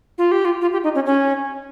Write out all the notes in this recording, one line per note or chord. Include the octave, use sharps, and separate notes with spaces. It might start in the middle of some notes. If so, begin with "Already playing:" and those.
F4
G4
F4
F4
G4
D#4
C#4
C#4